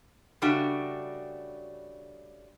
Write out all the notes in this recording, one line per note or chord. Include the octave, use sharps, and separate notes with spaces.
C#3 G3 A3 D4 F#4